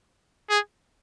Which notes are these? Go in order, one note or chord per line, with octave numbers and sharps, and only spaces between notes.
G#4